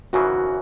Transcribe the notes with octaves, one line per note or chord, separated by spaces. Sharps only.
G#1 F#2 C#3 E3 F#4